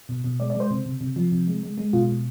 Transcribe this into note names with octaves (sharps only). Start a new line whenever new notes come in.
B2
B2
G#3 D5
D5
G#3
C5
C3
C3
C3
F3
C3
G#3
G#3
G#3
B2 F4
B2